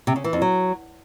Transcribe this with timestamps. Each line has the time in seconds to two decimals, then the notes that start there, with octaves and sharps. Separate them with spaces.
0.07 C3
0.16 C#3
0.24 E3
0.33 F2
0.42 F#3